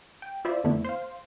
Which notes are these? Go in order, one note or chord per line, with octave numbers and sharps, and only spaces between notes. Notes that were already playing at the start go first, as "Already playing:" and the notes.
G5
E4 F4 C5 D5 E5
F2 D3 A3 B3 D4 E4
C5 F5